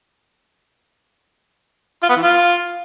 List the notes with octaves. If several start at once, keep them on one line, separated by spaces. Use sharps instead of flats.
F4
B3
E3
F4